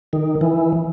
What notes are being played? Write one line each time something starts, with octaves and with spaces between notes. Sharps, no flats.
D#3
E3